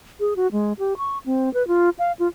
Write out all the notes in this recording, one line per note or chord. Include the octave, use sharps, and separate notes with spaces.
G#4
F#4
G#3
G4
C#6
C4
B4
F4
F5
F4